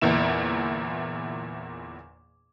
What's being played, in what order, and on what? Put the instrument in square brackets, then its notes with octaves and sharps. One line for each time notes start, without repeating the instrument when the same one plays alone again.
[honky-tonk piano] G1 E2 A#2 E4 E7